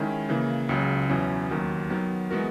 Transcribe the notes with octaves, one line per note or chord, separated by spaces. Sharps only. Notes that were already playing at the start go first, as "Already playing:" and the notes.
Already playing: D#3 G#3 C#4 E4
C#3 E3 A#3
C#2 C#3 F#3
E2 B2 F#3 C#4 E4
D#2 D#3 F#3
D#3 F#3 B3
E3 G#3 B3 F#4 A#4